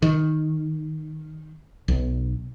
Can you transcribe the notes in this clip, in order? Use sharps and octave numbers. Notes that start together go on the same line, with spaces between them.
D#3
B1